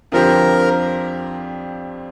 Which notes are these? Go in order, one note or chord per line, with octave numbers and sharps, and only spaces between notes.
F2 D3 F3 C4 G4 A#4